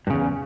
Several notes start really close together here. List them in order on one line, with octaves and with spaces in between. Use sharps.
G2 C#3 E2